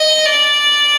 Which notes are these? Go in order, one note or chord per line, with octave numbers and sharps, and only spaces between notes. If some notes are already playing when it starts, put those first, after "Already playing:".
Already playing: D#5
D5